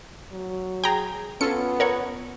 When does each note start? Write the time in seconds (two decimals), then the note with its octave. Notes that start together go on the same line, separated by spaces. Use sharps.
0.32 F#3
0.84 G#4 G5 A#5
1.41 B3 C#4 F4 A4 C#7
1.80 A#4 C#5 F#5